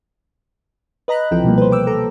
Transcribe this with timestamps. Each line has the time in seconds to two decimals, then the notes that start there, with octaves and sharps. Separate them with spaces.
1.08 B4 D#5 A#5 B5 F#6
1.31 C#2 C3 E3 F3 A4 G5
1.44 B2 F3 G3 A#3
1.58 B4 C5
1.72 G5 D6 E6
1.87 A4 A#5